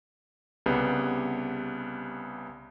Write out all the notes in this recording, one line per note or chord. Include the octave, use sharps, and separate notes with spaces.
C2 C#3 G3 B3